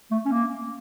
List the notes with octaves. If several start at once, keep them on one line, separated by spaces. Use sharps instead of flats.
A3
C#4
A#3